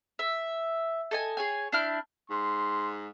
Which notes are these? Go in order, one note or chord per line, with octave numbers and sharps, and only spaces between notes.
E5
A4 D#5 G#5
G#4 C#5 G#5
D4 E4 F6 G6
G#2 C6